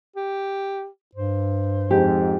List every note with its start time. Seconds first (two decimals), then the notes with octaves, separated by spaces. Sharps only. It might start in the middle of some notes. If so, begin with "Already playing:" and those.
0.16 G4
1.15 G2 C5
1.91 F2 G#2 G4